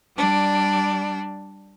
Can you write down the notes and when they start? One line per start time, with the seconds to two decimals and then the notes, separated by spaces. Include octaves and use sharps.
0.16 G3 D4